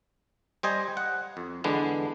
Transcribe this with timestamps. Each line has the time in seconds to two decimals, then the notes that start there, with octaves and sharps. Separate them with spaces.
0.63 G3 C5 D#5 G#5
0.97 F#5
1.37 F2
1.64 E2 D3 G#3 B3 D4